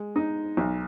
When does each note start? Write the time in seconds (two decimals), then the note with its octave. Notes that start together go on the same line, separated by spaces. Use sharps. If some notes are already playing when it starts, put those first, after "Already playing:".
Already playing: G#3
0.16 D#4
0.57 B1